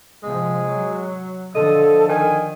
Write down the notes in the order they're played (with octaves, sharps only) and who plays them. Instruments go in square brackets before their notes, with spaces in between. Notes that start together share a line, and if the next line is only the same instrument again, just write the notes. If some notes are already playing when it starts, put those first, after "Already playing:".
[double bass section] C3 F3 [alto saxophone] G#3
[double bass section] F#3
[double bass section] D3 F3 [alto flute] A4 [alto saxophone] D#5
[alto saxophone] D#3 [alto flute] G#5